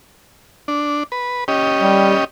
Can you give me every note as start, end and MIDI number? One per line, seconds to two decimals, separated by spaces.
0.68 1.03 62
1.12 1.44 71
1.48 2.24 61
1.48 2.24 67
1.48 2.24 75
1.81 2.15 55